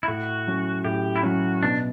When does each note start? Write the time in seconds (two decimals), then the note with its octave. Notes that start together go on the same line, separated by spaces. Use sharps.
0.03 E4
0.08 A2 F#4
0.47 F#3 C#4
0.85 A2 G4
1.16 E4
1.23 F#3 C#4 F#4
1.62 B2 D4